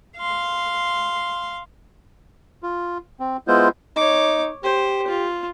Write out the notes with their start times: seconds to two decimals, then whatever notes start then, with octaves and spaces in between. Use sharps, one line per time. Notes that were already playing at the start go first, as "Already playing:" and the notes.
0.17 F5 C6
2.63 F4
3.20 C4
3.48 G#3 B3 E4 F4 C5
3.96 D#4 C#5 D6
4.64 G4 C5
5.07 F4